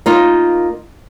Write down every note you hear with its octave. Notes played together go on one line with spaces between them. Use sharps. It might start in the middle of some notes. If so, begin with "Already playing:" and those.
A#3 D#4 F4